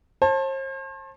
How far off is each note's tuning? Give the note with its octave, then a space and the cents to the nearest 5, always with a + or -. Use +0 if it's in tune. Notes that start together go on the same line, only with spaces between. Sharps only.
C5 +40 A5 +0